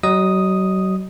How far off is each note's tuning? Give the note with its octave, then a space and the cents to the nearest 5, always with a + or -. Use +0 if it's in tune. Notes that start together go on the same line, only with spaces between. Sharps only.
F#3 +35 D#5 +0 D#6 +0